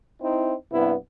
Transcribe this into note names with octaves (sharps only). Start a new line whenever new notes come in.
C4 D#4 E4
G2 C3 B3 E4